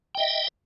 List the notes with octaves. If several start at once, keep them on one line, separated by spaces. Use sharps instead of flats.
D#5 E5 G5